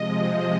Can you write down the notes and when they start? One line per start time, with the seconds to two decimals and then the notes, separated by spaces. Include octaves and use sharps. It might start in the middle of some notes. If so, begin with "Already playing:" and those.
Already playing: C3 F3 G#3 D#5